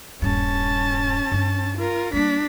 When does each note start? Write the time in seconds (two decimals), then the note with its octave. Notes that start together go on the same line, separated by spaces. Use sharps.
0.22 D#1 G2 C#4 A5
1.32 G2 D4
1.78 F4 A#4
2.13 G3 A#3 D4 B6